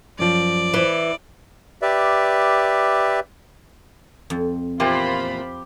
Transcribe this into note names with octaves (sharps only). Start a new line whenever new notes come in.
F#2 F3 D5
E3
G4 B4 D5 E5
F2
E2 A#2 A#3 F4 G4 C5 B5